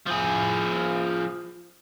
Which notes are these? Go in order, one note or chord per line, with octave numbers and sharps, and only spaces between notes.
F3 G#4